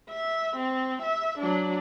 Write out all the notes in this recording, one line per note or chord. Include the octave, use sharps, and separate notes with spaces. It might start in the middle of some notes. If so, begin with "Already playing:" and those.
E5
C4
E5
F#3 D4